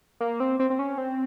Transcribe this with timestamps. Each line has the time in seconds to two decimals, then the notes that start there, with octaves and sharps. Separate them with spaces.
0.21 A#3
0.40 C4
0.59 C4
0.70 C4
0.79 C#4
0.98 C4